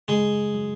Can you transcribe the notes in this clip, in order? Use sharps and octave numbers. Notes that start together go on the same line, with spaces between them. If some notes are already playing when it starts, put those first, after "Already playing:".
C#3 G#3 G#4
F#3